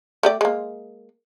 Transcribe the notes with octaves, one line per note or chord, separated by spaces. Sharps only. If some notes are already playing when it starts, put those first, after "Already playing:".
A3 G4 D5
G#3 A#3